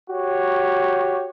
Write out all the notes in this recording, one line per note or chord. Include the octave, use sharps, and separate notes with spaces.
F#4 G4 C#5